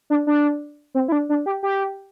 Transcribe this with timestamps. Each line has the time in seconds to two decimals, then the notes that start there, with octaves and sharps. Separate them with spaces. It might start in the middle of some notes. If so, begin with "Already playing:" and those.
0.10 D4
0.27 D4
0.95 C4
1.08 E4
1.12 D4
1.29 D4
1.46 G4
1.63 G4